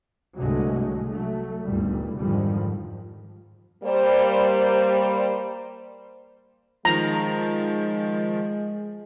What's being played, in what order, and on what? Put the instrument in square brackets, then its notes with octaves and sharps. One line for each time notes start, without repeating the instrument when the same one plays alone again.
[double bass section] C2 G2 D3 F#3 G#3 A3
F#3 A3
G1 D2 A#2 D#3 G3
F2 G#2 D3 D#3 F3 G3
[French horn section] G3 A#3 C5
[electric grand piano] D#3 F3 [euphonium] G#3 [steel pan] A#5